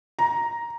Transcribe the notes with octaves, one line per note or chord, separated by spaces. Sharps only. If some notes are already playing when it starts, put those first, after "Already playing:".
A#5